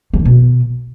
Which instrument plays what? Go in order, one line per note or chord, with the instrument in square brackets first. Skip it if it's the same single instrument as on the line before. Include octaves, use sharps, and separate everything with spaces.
[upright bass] F3
D#3
B2